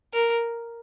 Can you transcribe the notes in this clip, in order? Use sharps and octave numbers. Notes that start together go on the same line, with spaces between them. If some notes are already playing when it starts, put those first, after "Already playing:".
A#4